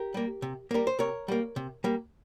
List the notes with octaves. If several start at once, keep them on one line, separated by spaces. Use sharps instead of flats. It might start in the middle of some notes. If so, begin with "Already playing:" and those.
Already playing: G4 A#4
G3 A#3
C3
G3 A#3 A#4
C5
C3 A#4 C#5
G3 A#3
C3
G3 A#3